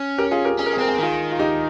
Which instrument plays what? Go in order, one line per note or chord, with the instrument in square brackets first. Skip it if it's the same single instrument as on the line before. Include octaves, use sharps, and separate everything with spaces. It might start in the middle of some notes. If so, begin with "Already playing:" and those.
Already playing: [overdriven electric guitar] C#4
[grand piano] G4 A#4
F4 G#4
G4 A#4
[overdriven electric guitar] C#4 [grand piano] G#4
[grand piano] A#4
G#4
[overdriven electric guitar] C4 [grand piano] A#4
[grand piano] G#4
A#4
[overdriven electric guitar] D#3 [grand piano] F4 G#4
[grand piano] F4
D#4 G4